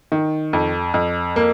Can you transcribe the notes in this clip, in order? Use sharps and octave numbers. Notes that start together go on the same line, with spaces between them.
D#3
F2
F2
A#3